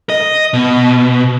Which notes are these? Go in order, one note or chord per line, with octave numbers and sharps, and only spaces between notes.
D#5
B2